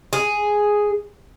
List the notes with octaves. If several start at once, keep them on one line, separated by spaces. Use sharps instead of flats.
G#4